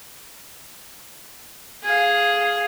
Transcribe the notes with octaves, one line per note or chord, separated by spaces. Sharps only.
G#4 F5